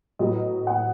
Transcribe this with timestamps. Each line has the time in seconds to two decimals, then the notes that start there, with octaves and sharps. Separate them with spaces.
0.19 A2 F#3 B3 D#5
0.67 F#5